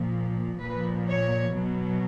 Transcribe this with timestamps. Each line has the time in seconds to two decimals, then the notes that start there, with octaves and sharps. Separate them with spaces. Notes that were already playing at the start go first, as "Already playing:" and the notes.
Already playing: A#2 F3
0.62 A#2 F3 B4
1.08 C#5
1.54 B2 F#3